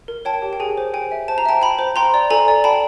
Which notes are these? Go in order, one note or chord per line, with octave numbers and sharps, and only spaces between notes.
A#4
C#5 G5 A5
G4
G5
G#4 G#5
C5
G5 G#5
E5
C5 A5
A#5
E5 G5 A5
G5 A5 B5
C5
G5 A#5 C6
D5
A4 G#5 A#5
D5
G5 A5 B5